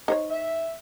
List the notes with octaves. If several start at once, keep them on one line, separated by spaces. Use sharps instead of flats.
D#4 C5 C#5
E5